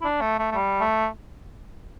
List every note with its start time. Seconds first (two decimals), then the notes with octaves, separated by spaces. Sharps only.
0.01 E4
0.04 D4
0.21 A3
0.39 A3
0.52 A3
0.55 G3
0.81 A3